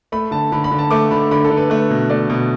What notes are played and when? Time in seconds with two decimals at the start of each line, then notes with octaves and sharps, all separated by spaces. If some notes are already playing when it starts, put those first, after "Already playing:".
0.12 A3 B5
0.31 D3 A5
0.52 D3 B5
0.64 B5
0.71 D3
0.79 A5
0.91 A3 D6
1.11 D3 B5
1.31 D3 B5
1.45 A4
1.51 D3
1.57 B4
1.70 A3 B4
1.90 B2
2.10 A3 D5
2.30 B2